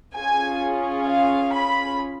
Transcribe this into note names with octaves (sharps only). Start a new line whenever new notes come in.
C#4 F4 G#4 G#5
F5
B5